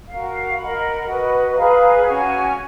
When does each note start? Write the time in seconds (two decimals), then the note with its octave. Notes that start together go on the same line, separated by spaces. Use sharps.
0.07 F#4 A#4 F5
0.56 A#4 D#5 F#5 B5
1.06 F#4 B4 D#5
1.55 G#4 B4 F5 A#5
2.04 C#4 F#4 C#5 G#5